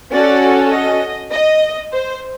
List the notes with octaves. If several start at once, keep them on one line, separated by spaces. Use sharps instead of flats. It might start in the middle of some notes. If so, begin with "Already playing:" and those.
C#4 F#4 A4 D5
D#5
D#5
C5